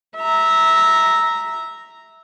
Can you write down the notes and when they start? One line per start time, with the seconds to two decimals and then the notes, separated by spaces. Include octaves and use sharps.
0.17 E5 A#5